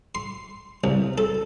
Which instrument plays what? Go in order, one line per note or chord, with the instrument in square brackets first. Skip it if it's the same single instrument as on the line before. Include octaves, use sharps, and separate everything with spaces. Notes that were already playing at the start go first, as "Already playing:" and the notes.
[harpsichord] C6
C2
A4